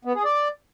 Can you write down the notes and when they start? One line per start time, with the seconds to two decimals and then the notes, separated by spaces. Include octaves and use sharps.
0.05 B3
0.15 G#4
0.25 D5